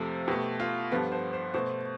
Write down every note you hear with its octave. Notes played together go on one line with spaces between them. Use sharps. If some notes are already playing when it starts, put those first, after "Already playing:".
Already playing: F2 C3 F3 A3 A4
B2 A3 G4
F4
G2 F3 B3 A4
C5
C5
B2 A3 C5